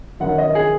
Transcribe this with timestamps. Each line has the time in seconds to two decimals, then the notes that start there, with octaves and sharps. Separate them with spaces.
0.20 F#2 D#3 F#5
0.38 D#5
0.55 G#4